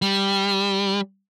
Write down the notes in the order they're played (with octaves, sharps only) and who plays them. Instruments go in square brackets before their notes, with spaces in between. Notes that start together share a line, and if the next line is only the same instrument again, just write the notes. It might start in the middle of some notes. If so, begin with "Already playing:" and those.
[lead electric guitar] G3